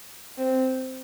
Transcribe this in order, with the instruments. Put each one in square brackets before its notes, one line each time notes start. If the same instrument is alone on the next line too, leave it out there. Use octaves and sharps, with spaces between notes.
[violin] C4